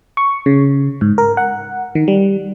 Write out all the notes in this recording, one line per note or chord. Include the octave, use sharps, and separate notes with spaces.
C#6
C#3
G#2
A#4
F#5
D#3
G3